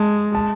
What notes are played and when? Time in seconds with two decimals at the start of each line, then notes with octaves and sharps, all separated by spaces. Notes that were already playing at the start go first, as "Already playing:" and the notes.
Already playing: G#3 A5
0.35 A5